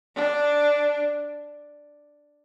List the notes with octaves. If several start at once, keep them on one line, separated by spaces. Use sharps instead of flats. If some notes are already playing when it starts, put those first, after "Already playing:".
D4